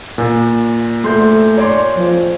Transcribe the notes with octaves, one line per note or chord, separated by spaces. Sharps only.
A#2
A3 C6 G6
C#5 D5 C6
F3